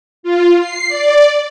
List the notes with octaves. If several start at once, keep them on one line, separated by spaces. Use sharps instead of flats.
F4
C7
D5